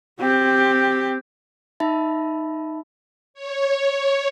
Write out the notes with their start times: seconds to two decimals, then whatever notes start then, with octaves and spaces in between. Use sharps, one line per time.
0.20 C4 G4
1.80 D#4 E5 A5 B5
3.34 C#5